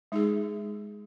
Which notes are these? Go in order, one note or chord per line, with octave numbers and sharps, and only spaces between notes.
G#3 D#4 G#4